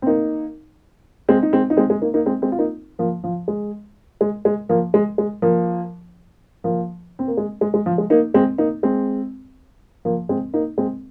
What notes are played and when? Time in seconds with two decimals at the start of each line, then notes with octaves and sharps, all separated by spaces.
0.02 C4
0.07 A#3 D#4
1.29 G#3 C4
1.43 D#4
1.53 G#3 C4
1.70 D#4
1.77 G#3 C4
1.90 G#3
2.02 A#3 D#4
2.14 A#3 D#4
2.26 G#3 C4
2.42 G#3 C4
2.52 F4
2.58 A#3 D#4
2.99 F3 A#3
3.24 F3
3.48 G#3
4.21 G#3
4.45 G#3
4.69 F3 A#3
4.94 G#3
5.18 G#3
5.42 F3 A#3
6.64 F3 A#3
7.19 C4
7.28 A#3
7.37 G#3
7.61 G#3
7.74 G#3
7.86 F3
7.98 G#3
8.10 A#3 D#4
8.34 G#3 C4
8.58 A#3 D#4
8.83 G#3 C4
10.05 F3 A#3
10.29 G#3 C4
10.54 A#3 D#4
10.78 G#3 C4